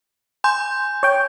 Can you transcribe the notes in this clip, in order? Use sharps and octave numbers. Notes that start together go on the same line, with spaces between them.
G#5 C6 G6
C#5 G5